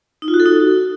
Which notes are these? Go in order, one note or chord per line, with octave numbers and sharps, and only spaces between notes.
D#4
F4
F#4
A4
D#4